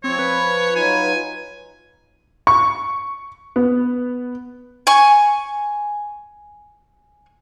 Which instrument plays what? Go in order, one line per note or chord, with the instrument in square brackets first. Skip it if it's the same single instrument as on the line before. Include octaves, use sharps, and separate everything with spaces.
[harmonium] F3 [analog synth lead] C4 [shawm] C#5
[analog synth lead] B4
[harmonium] F#3 D#4 F4 [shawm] G#5
[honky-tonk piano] C#6
B3
[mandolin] G#5 C#6